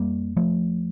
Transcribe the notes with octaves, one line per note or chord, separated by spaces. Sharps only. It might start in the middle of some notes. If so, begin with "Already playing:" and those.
Already playing: F2 G3 A#3
F3 A3